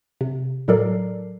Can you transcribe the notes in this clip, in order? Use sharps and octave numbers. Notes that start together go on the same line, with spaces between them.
C3
A2 F#3 A4 A#4 D5 C7